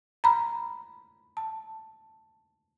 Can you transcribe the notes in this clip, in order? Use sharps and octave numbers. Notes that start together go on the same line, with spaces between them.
A#5 B5
A5